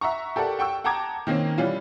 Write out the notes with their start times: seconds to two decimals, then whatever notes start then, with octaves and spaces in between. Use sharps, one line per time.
0.01 E5 F#5 A#5 C#6
0.36 G4 A4 A#4 D5 F#5
0.59 F#5 G5 C#6 E6
0.84 F#5 G5 A5 A#5 D6 G#6
1.27 D#3 A#3 C4 C#4
1.58 E3 G3 C#4 F4